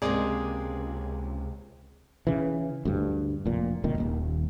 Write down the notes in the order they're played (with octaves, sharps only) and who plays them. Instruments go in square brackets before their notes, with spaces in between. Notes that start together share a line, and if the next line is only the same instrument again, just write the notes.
[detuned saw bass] C#2 [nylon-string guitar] C3 G#3 A#3 [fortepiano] G#4 D5 D#5
[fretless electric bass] C#3 E3
D2 G2
F1 A#2
C2 A#2 D#3
D#1 D#2